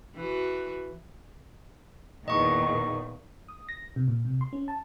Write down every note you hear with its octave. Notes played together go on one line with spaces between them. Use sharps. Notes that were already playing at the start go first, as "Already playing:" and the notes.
E3 F#4
E2 A#2 D#3 D#5 C#6
D#6
A#6
C3
A#2
C3
C6
C#4
A5